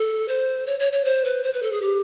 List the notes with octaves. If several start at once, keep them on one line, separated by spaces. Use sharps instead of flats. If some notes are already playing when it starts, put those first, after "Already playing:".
Already playing: A4
C5
C#5
C#5
C#5
C5
B4
C5
B4
A4
G#4
G4